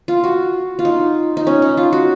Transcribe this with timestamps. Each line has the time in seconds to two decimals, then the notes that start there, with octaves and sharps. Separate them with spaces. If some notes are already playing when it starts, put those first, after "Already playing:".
0.08 F4
0.24 F#4
0.79 F4
0.85 D#4
1.37 D#4
1.47 C#4
1.62 D#4
1.77 F4
1.92 F#4